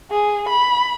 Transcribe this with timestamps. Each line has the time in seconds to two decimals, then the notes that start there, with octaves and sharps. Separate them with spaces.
0.11 G#4
0.49 B5